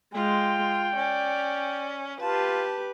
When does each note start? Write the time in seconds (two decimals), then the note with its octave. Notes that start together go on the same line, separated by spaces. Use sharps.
0.14 G#3 F4 G5
0.95 C#4 D5
2.21 F4 G4 B4 A5